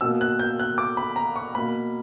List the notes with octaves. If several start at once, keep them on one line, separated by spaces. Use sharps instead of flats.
B2 A#3 E6
F#6
G6
F#6
D6
B5
A#5
C#6
B2 A#3 B5